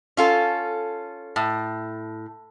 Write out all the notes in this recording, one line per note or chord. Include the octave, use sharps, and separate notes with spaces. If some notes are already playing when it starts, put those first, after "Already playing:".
C#4 F4 A4
A2